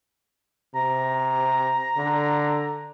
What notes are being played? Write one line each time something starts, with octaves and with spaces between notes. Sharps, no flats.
C3 A#5
D3